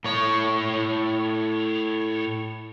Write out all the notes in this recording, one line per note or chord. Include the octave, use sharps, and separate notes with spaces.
A2 C#5